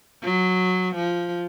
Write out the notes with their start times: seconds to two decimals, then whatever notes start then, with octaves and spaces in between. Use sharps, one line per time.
0.23 F#3
0.95 F3